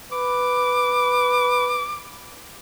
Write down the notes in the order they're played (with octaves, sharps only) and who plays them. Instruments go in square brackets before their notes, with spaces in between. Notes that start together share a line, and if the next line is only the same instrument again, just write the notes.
[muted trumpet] B4 [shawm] D6